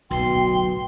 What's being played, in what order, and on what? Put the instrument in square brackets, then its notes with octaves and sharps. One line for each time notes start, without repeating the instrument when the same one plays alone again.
[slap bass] D1 B1 [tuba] B2 [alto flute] G5 [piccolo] C6